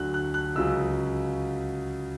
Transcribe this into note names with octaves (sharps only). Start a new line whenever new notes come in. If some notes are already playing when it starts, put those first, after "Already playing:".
Already playing: D2 D3 F#3 F#6
F#6
F#6
C#2 C#3 F#3 E6